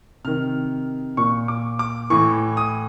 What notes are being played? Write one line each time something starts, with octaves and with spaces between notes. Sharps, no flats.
C3 D#3 F6
A#2 C#6
D6
D6
A2 E3 C#6
D#6